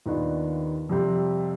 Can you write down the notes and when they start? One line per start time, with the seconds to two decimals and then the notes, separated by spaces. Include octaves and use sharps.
0.06 D#2 D#3 B3 D4 F4
0.89 F2 C3 G3 C4